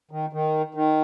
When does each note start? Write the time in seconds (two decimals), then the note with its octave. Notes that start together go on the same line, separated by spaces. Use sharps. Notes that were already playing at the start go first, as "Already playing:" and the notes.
0.11 D#3
0.33 D#3
0.74 D#3